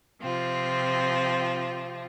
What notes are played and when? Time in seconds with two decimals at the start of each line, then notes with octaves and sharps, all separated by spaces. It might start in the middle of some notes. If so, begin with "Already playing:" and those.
0.21 C3 F3 C4 F4